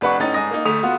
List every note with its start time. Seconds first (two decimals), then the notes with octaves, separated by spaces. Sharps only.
0.01 F1 D4 B4 F#5 C#6
0.19 A2 C#4 D#4 A6
0.34 G#2 G#5 D#6 A#6
0.51 A#3 D#4
0.65 D2 A3 D#6 F7
0.83 B3 F4 F#4